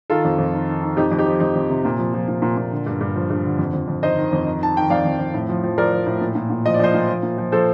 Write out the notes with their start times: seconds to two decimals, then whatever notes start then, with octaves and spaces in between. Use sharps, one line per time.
0.10 D#3 F4 A4
0.25 F2
0.38 F2
0.53 D#3
0.68 D#3
0.82 D#3
0.97 F2 D#4 G4
1.12 F2
1.19 D#4 G4
1.26 F3
1.40 F2 D#4
1.55 F2
1.70 C3
1.85 A#2
1.99 F3
2.14 F3
2.28 A#2
2.42 A#2
2.57 A#2
2.71 D3
2.86 G2
3.01 G2
3.16 F3
3.30 G2
3.44 D3
3.59 F2
3.73 F2
3.88 F2
4.03 D#3 C5 D#5
4.17 D#3
4.33 F2
4.47 D#3
4.61 D#3 A5
4.76 D#3 G5
4.90 F2 D5 F5
5.05 F2
5.19 F2
5.34 A2
5.49 F3
5.64 F3
5.78 F3 A#4 D5
5.92 F3
6.06 A2
6.21 A#2
6.35 A#2
6.50 A#2
6.66 F3 D#5
6.74 D5
6.79 F3 C5 D#5
6.94 A#2
7.09 F3
7.23 A#2
7.38 F3
7.52 F3 A4 C5